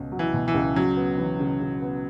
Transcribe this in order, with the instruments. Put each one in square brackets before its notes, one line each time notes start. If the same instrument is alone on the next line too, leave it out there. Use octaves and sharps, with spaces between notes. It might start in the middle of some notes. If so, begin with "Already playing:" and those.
Already playing: [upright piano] C#2 B2 C#4
F#3
[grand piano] E3
[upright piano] B2
[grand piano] E3
[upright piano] C#2
[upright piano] C#3 [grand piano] F#3
[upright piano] B3
E3
C#3
C#3
B3